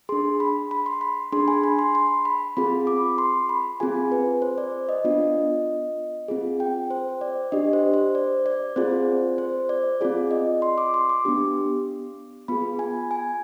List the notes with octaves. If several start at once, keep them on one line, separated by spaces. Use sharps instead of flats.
D4 G#4 C6
B5
B5
C6
B5
D4 G#4 C6
G#5
B5
C6
C6
B5
C4 F4 G#4 B5
D6
C6
B5
C4 F4 G#4 G#5
B4
C5
D5
D#5
B3 D4 F4
C4 F4 G#4
G5
C5
D5
D4 G4 D#5
C5
C5
D5
D5
C4 F4 G#4 C5
C5
D5
C4 F4 G#4 D5
D#5
C6
D6
C6
D6
B3 D4 G4
B3 F4 G#4 B5
G#5
G#5